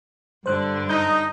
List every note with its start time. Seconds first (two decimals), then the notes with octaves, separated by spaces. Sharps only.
0.46 G2 D3 D4 C5 F#6
0.89 D#4 D#5 G6